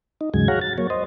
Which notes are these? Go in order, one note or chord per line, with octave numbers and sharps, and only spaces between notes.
D#4
D#2 G#2 C#3 F#3 G#3 G#6
F#4 G#4 C#5 F5 F#5 A#5
A6
F#3 A#3 C#5
C5 D#5